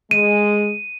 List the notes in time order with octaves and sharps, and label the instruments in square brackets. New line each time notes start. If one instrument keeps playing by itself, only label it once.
[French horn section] G#3 [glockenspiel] D#7